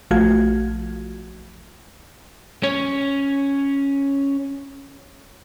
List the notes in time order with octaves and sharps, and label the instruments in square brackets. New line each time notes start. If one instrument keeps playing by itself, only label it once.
[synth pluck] A#1 F3 A3 F4 F#4 G#6
[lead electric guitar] C#4 C#5